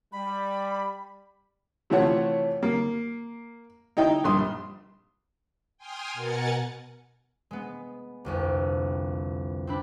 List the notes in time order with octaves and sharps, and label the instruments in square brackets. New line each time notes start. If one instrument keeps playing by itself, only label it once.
[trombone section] G3 [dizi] B5
[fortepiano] C3 E3 A3 F4 C#5 F#5
A#3
D#4 E4 D#5 G5
A#1 G2 C6 D#6
[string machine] G5 G#5 C6 D#6 F6
B2 A#4 F#5 G#5 A6 C#7
[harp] G#3 B3
G1 C2 F2
C4 D4 B5